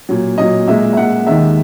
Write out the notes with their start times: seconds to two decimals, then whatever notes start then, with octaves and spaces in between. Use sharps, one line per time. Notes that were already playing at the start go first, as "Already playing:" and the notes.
0.09 A#2 F#3
0.38 A#2 F#3 D#5
0.67 A#2 G#3 E5
0.93 E5
0.97 A#2 G#3 F#5
1.27 D#2 D#3 G#3 E5